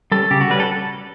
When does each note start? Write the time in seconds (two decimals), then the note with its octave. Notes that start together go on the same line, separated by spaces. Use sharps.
0.12 G3 C#4 A4
0.31 C#3 G4
0.41 F#4
0.50 G3 C#4 B4
0.60 A4